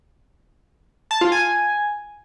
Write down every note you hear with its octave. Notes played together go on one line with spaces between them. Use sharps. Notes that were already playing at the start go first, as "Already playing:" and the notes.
A5
F4
G#5